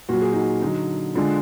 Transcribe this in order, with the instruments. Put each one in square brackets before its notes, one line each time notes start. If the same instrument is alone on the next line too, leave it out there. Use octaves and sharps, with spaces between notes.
[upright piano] A#2 F#3 F#4
G#4
D#4 F#4
D3 F#3 D#4
D3 G#3 D4 F4